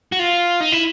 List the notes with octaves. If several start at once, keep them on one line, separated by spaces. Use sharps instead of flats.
F#4
F4
D#4
E4